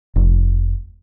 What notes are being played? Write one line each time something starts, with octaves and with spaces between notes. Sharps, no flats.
F1